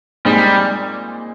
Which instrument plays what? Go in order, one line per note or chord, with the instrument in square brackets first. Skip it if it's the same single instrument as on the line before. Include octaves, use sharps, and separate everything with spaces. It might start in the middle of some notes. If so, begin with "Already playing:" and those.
[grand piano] A#2 G#3 C4 D#4 [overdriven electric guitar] G3